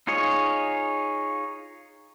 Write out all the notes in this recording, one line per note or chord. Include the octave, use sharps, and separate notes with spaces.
D#4 F4 G#4 C#5 D#5